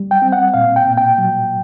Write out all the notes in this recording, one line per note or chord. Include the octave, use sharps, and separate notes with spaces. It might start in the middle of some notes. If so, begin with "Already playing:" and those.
Already playing: G3
G5
C4
F#5
A#2 F5
G5
A#2
G5
F#3